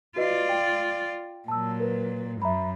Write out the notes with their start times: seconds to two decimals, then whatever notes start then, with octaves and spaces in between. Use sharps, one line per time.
0.16 F4 F#4 B4 D5 D#5
0.49 G5
1.48 A#2 F#3 A5 E6
1.80 A#4 B4
2.42 F#2 E5 A#5 B5